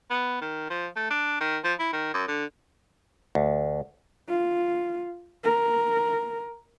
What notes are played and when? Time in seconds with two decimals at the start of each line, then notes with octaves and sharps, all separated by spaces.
0.10 B3
0.41 D#3
0.70 F3
0.96 A3
1.10 D4
1.41 D#3
1.64 F3
1.79 E4
1.93 D#3
2.14 F#2
2.28 D3
3.35 D2
4.29 F4
5.44 A#4